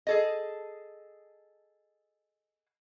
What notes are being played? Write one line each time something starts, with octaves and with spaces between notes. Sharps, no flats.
G#4 A4 D#5